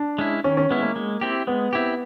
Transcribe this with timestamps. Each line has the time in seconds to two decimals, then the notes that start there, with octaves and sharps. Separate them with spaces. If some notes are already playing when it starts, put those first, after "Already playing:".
Already playing: D4
0.18 G#3 C#4 E4
0.44 D#3 C#4
0.57 C#4
0.70 G#3 B3 C#4 E4
0.83 A#3
0.96 G#3
1.21 C4 E4 G4
1.47 G#3 B3
1.73 C4 E4 G4